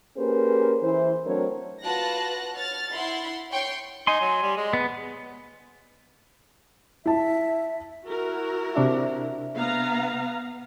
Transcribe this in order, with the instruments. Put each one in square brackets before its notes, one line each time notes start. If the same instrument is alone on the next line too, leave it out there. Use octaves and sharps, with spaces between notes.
[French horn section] A#3 C#4 G4 G#4 B4 C5
E3 E4 C5
F#3 A3 C4 D4 A#4 C#5
[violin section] F4 F#4 B4 A5 F#6 A#6
C#5 F6 A6
E4 F#5 B5 C6
C#5 G5 C6 C#6
[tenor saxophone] D#4 [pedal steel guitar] G#5 C6
[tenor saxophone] F#3
G3
G#3
[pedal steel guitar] B3
[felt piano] E4 A5 [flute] E5
[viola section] E4 F#4 A#4
[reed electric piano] C3 D4 E5
[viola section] B3 F5 A#5